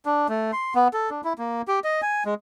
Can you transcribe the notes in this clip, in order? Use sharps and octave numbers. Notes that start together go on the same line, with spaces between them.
D4
A3
C6
B3
A4
D4
E4
A#3
G4
D#5
G#5
G#3